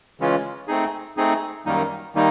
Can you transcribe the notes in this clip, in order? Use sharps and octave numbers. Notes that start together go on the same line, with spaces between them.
C#3 E3 G#3 C#4 F4
A3 C4 D#4 G#4
A3 C4 D#4 G#4
F#2 D#3 G3 A#3 D#4
D#3 G3 A#3 D#4